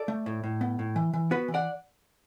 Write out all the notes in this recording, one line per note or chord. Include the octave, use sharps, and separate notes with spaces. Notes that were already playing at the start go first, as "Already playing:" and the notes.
Already playing: A4 D5
A3
A2
A2
B3
A2
E3
E3
B3 F#4 B4
E3
D5 F#5